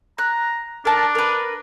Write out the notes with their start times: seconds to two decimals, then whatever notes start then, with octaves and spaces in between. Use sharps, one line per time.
0.18 A#5 F#6
0.85 D4 A#4 A5
1.15 A#4 B4